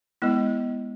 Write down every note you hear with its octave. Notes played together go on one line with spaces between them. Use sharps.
G#3 B3 E4